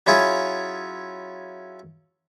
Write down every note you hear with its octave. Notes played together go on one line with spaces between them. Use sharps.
F#3 C#4 E4 F4 G#4